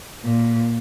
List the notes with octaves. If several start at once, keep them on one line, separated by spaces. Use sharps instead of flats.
A#2